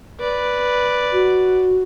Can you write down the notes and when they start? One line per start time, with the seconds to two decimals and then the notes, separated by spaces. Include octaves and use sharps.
0.20 B4 D5
1.13 F#4